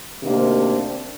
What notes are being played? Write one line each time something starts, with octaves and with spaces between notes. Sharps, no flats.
D2 C3 D#3 A#3 D4
C4